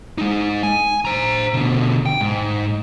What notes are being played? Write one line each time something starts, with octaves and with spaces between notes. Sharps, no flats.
G#3 D#4
G#5
C5 A#5
B2 D3
G5
G#2